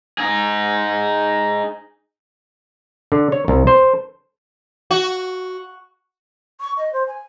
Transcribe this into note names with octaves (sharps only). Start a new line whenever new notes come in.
D#4 G#4
D3
C#5
C2
C5
F#4
C#6
D#5
C5
G#5